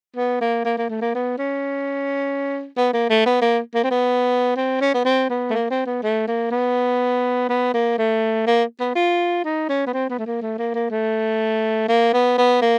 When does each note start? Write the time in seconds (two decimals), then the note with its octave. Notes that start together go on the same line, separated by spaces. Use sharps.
0.16 B3
0.41 A#3
0.64 A#3
0.77 A#3
0.89 A3
1.01 A#3
1.14 B3
1.38 C#4
2.77 B3
2.93 A#3
3.09 A3
3.26 B3
3.41 A#3
3.75 A#3
3.83 C4
3.91 B3
4.56 C4
4.81 C#4
4.94 B3
5.05 C4
5.29 B3
5.50 A3
5.53 A#3
5.70 C4
5.86 B3
6.03 A3
6.27 A#3
6.51 B3
7.49 B3
7.74 A#3
7.98 A3
8.47 A#3
8.80 B3
8.95 F4
9.44 D#4
9.69 C#4
9.86 B3
9.93 C4
10.10 B3
10.18 A3
10.26 A#3
10.42 A3
10.58 A#3
10.74 A#3
10.91 A3
11.88 A#3
12.13 B3
12.38 B3
12.62 A#3